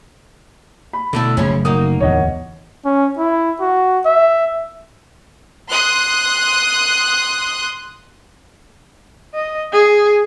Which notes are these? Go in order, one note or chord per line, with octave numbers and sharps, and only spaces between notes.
B5
B2 D3 A3 E4
F#1 C#3 F3 F#3 A3 C#4
A#3 D#4 F#4 D#6
D1 E2 C#5 D#5 F#5
C#4
E4
F#4
E5
C6 D#6 F#6
D#5
G#4